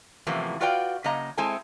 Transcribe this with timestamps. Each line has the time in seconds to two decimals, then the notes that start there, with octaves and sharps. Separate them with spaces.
0.27 F#2 A2 C3 E3 F3 A#3
0.60 F4 F#4 B4 D5 F5 G5
1.04 C#3 F#3 A#3 D#5 A#5
1.37 G#3 C4 E4 A4 G#5